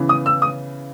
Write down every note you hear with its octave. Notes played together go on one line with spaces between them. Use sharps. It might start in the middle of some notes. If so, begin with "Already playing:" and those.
Already playing: C#3 E3 B3
D#6
E6
D#6